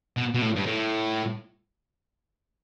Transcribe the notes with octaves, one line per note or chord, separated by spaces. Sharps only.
B2
B2
A2
G2
A2